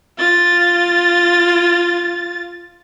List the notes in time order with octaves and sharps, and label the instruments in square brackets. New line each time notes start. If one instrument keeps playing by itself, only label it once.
[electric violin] F4 A6